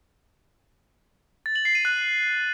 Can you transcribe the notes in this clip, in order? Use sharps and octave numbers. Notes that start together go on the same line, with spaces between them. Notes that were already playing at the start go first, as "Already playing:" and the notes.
A6
F#7
C7
D#7
F#6